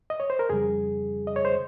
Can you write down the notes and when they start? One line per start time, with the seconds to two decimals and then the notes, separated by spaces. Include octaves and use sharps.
0.10 D#5
0.20 C#5
0.30 C5
0.39 A#4
0.49 F2 C#3 G3 G#4
1.27 D#5
1.36 C#5
1.45 C5